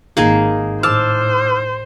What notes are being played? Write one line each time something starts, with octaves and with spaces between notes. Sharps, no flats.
G#1 A#3 D#4 G#4
A2 C5 A5 D6 E6 F6